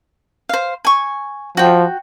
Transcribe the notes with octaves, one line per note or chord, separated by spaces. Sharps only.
C5 F5
G#5 C#6
F3 F#4 G5